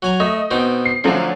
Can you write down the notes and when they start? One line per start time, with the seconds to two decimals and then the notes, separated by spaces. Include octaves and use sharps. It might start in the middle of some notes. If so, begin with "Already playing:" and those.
0.02 F#3 G#5 A#5
0.20 A3 D#5
0.51 B2 C4 D#4
0.85 C7
1.04 D3 F3 F#3 A3 C#4